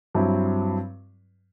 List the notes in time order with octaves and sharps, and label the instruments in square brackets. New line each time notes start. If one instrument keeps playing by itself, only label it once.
[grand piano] G2 F#3 C4 E4